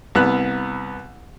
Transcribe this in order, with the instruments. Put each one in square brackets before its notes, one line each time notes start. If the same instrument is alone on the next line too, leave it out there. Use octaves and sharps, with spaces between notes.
[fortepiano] C2 B3 F#6